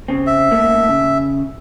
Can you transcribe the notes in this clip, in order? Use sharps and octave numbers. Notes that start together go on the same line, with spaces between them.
C#3 C4
E5
G#2 A3 A#3
C#3